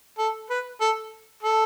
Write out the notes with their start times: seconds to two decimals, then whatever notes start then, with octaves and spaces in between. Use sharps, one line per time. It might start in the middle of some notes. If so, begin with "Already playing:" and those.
0.18 A4
0.50 B4
0.81 A4
1.43 A4